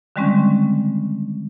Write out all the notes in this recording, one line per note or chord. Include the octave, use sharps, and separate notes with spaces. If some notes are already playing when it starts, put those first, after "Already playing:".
D3 D#3 G3 G#3 C4 C#4